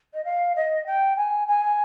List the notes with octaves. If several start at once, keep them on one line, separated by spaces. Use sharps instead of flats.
D#5
F5
D#5
G5
G#5
G#5